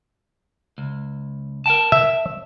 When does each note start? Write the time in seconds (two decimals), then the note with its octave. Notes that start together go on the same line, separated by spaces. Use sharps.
0.78 C#2
1.66 A#4 G5 A5
1.92 E5